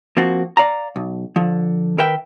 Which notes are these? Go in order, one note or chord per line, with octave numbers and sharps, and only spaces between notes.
F3 A#3 C4 F#4
D5 F5 A#5
B1
D3 F3
D#3 A#4 B4 E5 G5